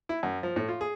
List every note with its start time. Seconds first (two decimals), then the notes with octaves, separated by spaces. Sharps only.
0.09 E4
0.23 F#2
0.43 F3
0.56 A2
0.68 F4
0.81 G#4